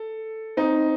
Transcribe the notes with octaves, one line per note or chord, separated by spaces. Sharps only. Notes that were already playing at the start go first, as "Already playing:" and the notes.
Already playing: A4
C4 D#4